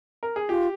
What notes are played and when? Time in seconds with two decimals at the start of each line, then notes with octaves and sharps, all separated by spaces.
0.23 A#4
0.36 G#4
0.49 F4 G4